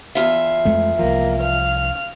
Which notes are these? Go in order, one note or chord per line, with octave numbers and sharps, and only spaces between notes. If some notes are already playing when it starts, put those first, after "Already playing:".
E2 F4 E5
F2 G#3 A3
C2 F3 A#3
F5 F6